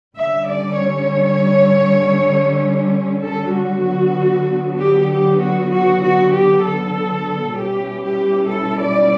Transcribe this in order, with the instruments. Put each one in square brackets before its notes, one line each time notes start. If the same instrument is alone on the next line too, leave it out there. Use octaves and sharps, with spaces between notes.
[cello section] D3 G3 C#4 E5
D5
C#5
A4
F#4
D3 F#3 B3
G4
G4
F#4
F#4
F#4
G4
A4
B2 G3 C#4 E4 G4
G4
A4
D5